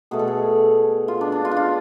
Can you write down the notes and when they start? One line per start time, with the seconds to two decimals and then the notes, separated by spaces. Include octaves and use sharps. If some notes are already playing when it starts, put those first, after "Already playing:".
0.11 B2 A3 G#4
0.19 A4
0.28 G#4
1.08 F4
1.21 D4
1.32 D4
1.45 F4
1.51 D4
1.57 F4